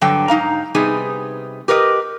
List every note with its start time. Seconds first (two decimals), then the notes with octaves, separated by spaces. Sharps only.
0.01 G2 D3 F#3 A4 G5
0.28 G#2 D#4 F5 A#5
0.75 C3 G3 B3 D#4 G#4
1.68 G4 A#4 B4 C#5 D#5